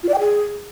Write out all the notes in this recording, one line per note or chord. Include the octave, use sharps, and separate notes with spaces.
F4
D5
G5
G#4